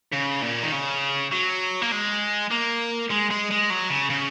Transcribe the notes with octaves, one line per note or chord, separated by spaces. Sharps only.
C#3
A#2
D#3
C#3
F#3
A#3
G#3
A#3
G#3
G#3
G#3
F#3
C#3
C#3